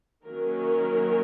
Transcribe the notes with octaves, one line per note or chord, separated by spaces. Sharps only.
D#3 F#3 A#3 C#4 A#4
A#4